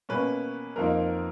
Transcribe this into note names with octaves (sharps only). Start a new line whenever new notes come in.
B2 A#3 C#4 B4
F2 F3 A#3 D#4 A#4